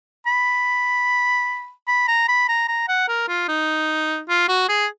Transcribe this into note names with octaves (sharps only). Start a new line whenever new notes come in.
B5
B5
A#5
B5
A#5
A#5
F#5
A#4
F4
D#4
F4
F#4
G#4